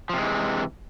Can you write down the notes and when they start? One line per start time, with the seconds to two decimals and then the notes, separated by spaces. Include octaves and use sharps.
0.09 F3
0.14 C3
0.18 G#3
0.22 E3